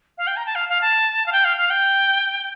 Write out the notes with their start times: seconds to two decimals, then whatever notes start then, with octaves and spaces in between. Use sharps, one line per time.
0.18 F5
0.27 G5
0.37 A#5
0.46 A5
0.55 F5
0.69 F5
0.81 A5
1.26 F5
1.32 G5
1.45 F5
1.57 F5
1.70 G5